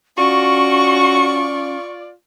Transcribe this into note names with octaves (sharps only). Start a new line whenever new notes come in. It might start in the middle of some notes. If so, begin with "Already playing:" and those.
C#4 F4 F#4 D5 C#6